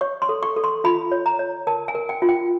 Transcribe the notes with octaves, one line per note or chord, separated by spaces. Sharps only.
C#5 C#6
C6
A4
C#6
A4
C6
F4 B5
C#5
A#5
C#5
A#4 A5
G#5
A#4
G5
F4
G5